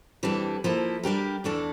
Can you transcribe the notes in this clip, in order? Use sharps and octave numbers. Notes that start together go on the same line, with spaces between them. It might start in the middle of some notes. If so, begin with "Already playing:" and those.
F2 E3 G3 D4 A4
F3 A#3 E4 A4
G3 D4 G4 A#4
E2 E3 A3 D4 A4